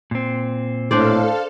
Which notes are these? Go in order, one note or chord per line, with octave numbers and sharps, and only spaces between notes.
A#2 C4
A2 D4 A4 C5 D5 F5